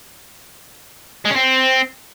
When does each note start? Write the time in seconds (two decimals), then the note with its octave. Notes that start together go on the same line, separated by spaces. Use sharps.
1.25 G#3
1.31 C#4
1.36 C4